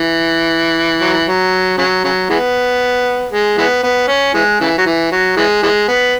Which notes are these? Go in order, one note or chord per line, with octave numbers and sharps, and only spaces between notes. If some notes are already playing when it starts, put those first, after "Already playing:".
Already playing: E3
F#3
E3
F#3
C#3 F#3
C#3 F#3
E3 G#3 B3
G#3
E3 G#3 B3
B3
C#4
E3 G#3
C#3 E3
F#3
E3
F#3
E3 G#3
E3 G#3
B3